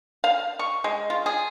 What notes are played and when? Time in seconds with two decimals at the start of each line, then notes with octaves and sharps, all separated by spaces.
0.24 F5
0.59 C#6
0.84 G#3
1.10 F4
1.26 G#4